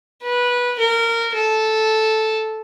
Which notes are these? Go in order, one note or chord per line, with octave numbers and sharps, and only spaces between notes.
B4
A#4
A4